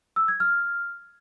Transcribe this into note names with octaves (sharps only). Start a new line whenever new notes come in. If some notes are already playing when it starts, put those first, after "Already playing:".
E6
G#6
F6